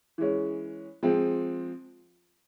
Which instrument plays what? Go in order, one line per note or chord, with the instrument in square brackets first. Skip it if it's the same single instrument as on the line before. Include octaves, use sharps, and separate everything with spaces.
[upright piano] E3 G#3 C#4
F3 G#3 C4